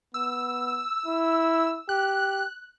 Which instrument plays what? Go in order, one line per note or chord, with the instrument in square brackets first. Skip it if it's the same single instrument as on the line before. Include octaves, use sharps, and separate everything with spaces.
[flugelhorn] B3 [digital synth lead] E6
[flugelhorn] E4
[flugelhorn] G4 [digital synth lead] F#6